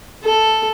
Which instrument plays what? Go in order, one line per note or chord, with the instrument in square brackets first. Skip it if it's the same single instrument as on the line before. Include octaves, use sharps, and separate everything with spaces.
[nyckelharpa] A4